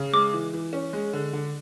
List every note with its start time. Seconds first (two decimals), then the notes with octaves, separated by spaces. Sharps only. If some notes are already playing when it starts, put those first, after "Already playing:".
Already playing: C#3
0.13 G#3 D6
0.33 E3
0.53 E3
0.73 C#4
0.93 G#3
1.13 D3
1.33 D3